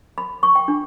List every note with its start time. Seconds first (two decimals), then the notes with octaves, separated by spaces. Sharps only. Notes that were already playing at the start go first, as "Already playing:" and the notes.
0.18 B5
0.43 C#6
0.55 G5
0.68 D4